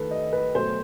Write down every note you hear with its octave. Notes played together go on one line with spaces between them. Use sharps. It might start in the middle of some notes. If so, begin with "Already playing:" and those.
Already playing: D#3 A3 A4 B4
D#5
B4
B2 F#3 A3 C5